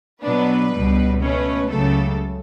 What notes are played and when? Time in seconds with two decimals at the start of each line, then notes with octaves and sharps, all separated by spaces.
0.23 B2 F#3 B3 D4 B4
0.72 C#2 B2 G3
1.21 B2 A3 C#4 B4
1.70 C#2 C#3 F#3 A3 A4